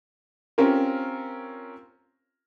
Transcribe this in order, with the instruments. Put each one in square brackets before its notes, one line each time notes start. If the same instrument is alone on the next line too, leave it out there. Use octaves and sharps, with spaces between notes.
[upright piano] C4 C#4 F4 G4 A#4